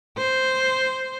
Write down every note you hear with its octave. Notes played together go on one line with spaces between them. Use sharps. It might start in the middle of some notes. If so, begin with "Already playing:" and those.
C5